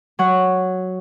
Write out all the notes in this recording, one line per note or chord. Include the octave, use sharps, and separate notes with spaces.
F#3 F#5